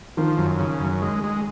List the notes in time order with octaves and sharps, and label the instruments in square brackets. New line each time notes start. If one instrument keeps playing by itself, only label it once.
[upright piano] D#3 [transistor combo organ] F3
[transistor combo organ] F#2
C#3
F#2
G#3
G#3